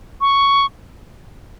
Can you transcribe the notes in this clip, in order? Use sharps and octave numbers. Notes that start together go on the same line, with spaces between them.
C#6